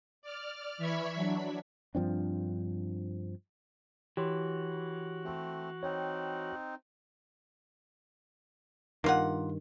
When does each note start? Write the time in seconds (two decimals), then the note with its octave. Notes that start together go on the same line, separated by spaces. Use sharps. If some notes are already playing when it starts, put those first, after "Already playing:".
0.22 D5 F6
0.78 E3 E5 B5 C#6 G#6 B6
1.15 F#3 D4
1.95 G2 F3 C4 D4
4.17 E3 F#4 G4 C#5 C6
5.24 A3 C4
5.83 C4 D#4 C#5 G5
9.04 G2 D#3 A#3 F4 F#5